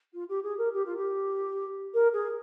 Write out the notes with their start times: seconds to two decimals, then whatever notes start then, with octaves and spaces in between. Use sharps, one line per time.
0.13 F4
0.29 G4
0.43 G#4
0.58 A#4
0.73 G4
0.85 F4
0.97 G4
1.94 A#4
2.13 G#4